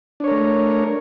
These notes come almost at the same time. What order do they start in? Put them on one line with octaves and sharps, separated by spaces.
D4 C#5 A#4 A3